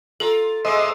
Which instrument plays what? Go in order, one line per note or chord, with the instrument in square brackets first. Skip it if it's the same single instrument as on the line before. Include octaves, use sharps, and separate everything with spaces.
[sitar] F4 A#4 [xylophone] A4
[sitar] G#3 A#3 [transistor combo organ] C5 D#5 E5